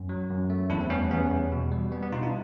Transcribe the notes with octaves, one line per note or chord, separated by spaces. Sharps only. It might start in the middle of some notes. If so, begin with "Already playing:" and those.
Already playing: F#2
F#3
F#2
A3
E2 D4 E4
C4
G3 B3 C#4
E2 B3 C#4
E2
B2
G3
G3 B3
B3
B2 D#4 F4
D4 E4